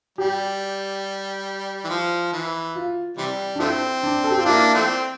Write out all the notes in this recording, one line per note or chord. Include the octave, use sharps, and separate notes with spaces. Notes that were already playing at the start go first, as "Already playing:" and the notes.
G3 G4
E3
F3
E3
F4
C3 E3 G3
D4
F3 A3 C4 E4
D4
A4
G4
F4
A#3 D4 E4
F3 A3 C4